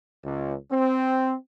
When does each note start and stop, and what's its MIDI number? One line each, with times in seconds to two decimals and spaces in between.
0.24 0.54 37
0.71 1.34 60